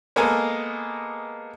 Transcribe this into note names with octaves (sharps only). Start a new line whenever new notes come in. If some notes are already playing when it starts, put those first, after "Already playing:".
G#3 A#3 B3 A4 A#4 G#5